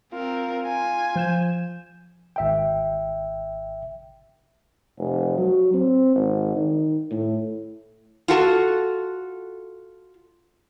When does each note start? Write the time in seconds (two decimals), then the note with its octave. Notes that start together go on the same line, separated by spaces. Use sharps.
0.12 C4 F4 A#4
0.67 G#5
1.16 F3 G6 E7
2.36 G#1 E5 G5
4.98 F1
5.38 F#3
5.74 C4
6.15 G#1
6.56 D#3
7.11 A2
8.28 F4 F#4 A4